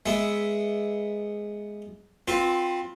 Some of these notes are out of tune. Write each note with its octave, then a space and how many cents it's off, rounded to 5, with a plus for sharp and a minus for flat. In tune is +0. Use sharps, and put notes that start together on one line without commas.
G#3 +0 B3 +0 E5 +0
C4 +0 F4 +20 B4 +0